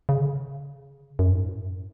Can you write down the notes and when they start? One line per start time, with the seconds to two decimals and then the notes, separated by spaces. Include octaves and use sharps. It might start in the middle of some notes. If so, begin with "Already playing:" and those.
0.09 C#3
0.21 D3
0.32 C#3
1.19 F#2
1.33 G#2
1.46 A2
1.61 F#2